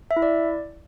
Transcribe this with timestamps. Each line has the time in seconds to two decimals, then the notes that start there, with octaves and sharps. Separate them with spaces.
0.11 E5
0.16 E4
0.22 D5